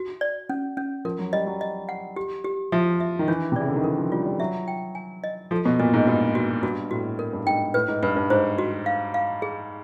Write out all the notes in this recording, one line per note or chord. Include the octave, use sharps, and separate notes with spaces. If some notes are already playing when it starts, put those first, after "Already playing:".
Already playing: F#4
D5
C#4
C#4
F3 A#4
F#3
G3 D#5
F#3
D#5
F#5
G4
G4
F3 E5
E5
D#3
E3 D4
C3
C#3 D5
D3
D#3
E3 A#4
F3
G3 F4
G3
F#3 E5
G5
G#5
D#5
F3 A4
B2
A#2 F#4
G#2
G2 F#4
F#4
G2 F#4
A2 F#4
A#4
G2
G#2 G5
A2 B4
G#2
G2 B4
G2
G#2 C5
F#4
F5
F5
G#4